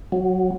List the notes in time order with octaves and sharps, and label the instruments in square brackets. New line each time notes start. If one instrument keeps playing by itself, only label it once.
[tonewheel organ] F#3